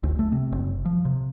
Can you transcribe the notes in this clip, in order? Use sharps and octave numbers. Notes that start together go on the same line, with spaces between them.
D2
A3
C3
F#1
F3
C3